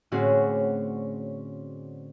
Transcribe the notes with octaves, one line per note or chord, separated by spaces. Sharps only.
A2 D3 C4 C#4 F#4 G#4